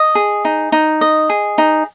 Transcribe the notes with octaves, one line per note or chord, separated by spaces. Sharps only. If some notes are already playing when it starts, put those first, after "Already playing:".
Already playing: D#5
G#4
D#4
D#4
D#5
G#4
D#4